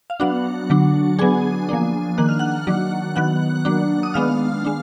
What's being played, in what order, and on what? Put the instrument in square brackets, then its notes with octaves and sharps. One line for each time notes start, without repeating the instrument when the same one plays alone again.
[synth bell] F5
F#3 B3 D4 F#4 F#5
D3 F#3 D4
F#3 B3 D4 G#4 G#5
F3 A#3 D4
D#3 A#3 D4 F#6
F6
F#5 F#6
D#3 F#3 D4
D#3 F#3 B3 F#5 F#6
F#3 A#3 D4
D#6
D#3 G#3 B3 D4 F5 F6
G#3 D4